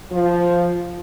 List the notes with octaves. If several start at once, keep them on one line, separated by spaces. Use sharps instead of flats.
F3